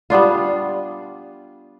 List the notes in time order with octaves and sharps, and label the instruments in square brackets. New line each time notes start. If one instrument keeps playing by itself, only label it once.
[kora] G3 B3 D4 F4